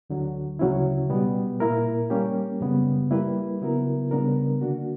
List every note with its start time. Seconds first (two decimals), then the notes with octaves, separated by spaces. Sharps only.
0.10 D2 D3 F#3
0.59 D2 C#3 F#3 C#4 E4
1.10 B2 G3 B3
1.60 A#2 A#3 E4 A#4
2.10 G3 A#3 C#4 G4
2.61 F#2 C#3 G3 B3
3.11 G3 A#3 E4 B4
3.61 C#3 F#3 B3 E4 A#4
4.11 C#3 G3 B3 D4 A#4
4.61 D3 A#3 D4 F#4